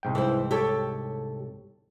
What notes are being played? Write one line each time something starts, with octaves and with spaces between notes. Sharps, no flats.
C2 G#2 G5
E3 C5
G4 A4 C#5